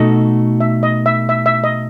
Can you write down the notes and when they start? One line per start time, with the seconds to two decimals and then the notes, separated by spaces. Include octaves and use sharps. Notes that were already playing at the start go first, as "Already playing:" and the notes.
Already playing: B2 A3 D#4 F#4 A4 D#5
0.60 E5
0.83 D#5
1.06 E5
1.29 E5
1.46 E5
1.64 D#5